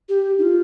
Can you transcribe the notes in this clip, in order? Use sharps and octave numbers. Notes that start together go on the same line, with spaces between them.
G4
D#4
F4